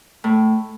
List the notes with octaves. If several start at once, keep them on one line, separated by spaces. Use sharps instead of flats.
A2